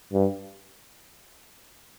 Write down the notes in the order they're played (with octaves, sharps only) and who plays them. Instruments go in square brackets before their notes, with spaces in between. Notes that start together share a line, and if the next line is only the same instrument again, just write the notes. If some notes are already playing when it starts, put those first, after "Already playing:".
[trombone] G2